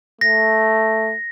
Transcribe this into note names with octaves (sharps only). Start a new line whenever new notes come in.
A3 A#6